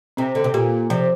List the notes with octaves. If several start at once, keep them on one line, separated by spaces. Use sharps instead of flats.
C3 C4
D3
C3
A#2 G4
C3 F3